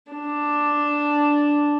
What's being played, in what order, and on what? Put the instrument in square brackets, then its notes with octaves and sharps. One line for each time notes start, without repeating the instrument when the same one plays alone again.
[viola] D4